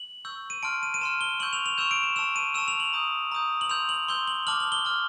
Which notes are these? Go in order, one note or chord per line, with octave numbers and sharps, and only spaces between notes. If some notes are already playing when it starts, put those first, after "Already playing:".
Already playing: F#7
C#6 E6 G6
D#7
A5 C6 F6 D7
D#7
D#7
A5 C6 F6 E7
G7
C#6 E6 G6 F#7
F7
F7
C#6 E6 G6 E7
D7
E7
A5 C#6 E6 E7
D#7
A5 C#6 E6 E7
F7
F#7
A#5 D#6 G6
A#5 D#6 G6
F#7
C6 E6 G6 F7
F#7
C6 E6 G6 G7
F#7
A5 D6 F6 F#7
F#7
G7
A5 D6 F6